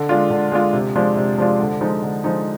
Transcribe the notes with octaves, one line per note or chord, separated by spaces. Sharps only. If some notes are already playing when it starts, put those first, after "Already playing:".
Already playing: D3
G#3 D4 F4
D3
G#3 D4 F4
C3
F3 G#3 D4 F4
C3
F3 G#3 D4 F4
D3
F3 G#3 D#4
D3
F3 G#3 D#4